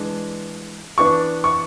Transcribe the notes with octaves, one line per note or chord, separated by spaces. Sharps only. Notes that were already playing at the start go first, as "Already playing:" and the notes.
Already playing: E3 G#3 D4
E3 B3 D4 C#6
C#6